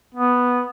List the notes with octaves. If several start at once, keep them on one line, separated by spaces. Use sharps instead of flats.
B3